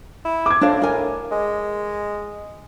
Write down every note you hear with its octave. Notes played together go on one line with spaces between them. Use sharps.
E4
D6 G#6
A2 D4 C5 F5
A#4 G#5
G#3